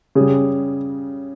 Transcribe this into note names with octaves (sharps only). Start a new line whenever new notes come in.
C#3 G3 G#4